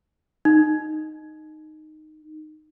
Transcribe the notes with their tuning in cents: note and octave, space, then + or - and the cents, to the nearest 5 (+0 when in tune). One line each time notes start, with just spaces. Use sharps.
D#4 -10